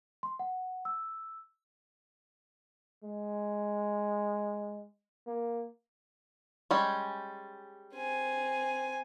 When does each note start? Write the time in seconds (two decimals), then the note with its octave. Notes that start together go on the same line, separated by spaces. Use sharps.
0.23 C6
0.39 F#5
0.85 E6
3.04 G#3
5.27 A#3
6.71 G3 G#3 C#4
7.95 C4 G#5